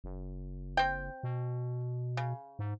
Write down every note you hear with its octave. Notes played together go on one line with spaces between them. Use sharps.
F#1
C4 G5
B2
C#3
G#2